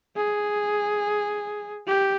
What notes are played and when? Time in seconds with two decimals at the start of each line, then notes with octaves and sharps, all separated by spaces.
0.16 G#4
1.87 G4